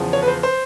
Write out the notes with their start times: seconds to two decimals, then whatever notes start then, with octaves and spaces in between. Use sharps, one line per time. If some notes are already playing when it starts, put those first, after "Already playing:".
Already playing: E2 C#3 F3
0.13 C#5
0.23 B4
0.28 C5
0.43 C5